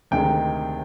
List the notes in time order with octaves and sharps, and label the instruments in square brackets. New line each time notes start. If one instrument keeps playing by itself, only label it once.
[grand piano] D2 C3 D#3 G#3 G5